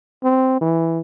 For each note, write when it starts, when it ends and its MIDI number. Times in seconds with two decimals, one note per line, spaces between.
0.24 0.59 60
0.61 1.00 52